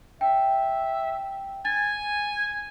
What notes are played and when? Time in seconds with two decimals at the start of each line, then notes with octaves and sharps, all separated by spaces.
0.21 E5 G5
1.65 G#5 A6